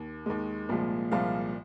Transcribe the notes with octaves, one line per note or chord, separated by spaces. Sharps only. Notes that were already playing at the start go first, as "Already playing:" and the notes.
Already playing: D#2
D#2 D#3 G#3
C2 A#2 F3 G#3
C2 A#2 F3 G#3 F5